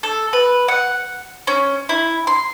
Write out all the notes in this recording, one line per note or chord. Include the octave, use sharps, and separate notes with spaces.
A4
B4
F#5
C#4
E4
C6